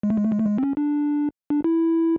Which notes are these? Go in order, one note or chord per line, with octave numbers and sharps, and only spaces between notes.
G#3
A3
G#3
A3
G#3
A3
G#3
C4
C#4
D4
D4
E4